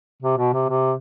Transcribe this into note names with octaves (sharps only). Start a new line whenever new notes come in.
C3
B2
C3
C3